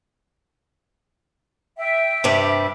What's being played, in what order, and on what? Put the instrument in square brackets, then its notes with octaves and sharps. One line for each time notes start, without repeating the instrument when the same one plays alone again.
[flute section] E5 G5
[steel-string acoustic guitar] G2 C3 G3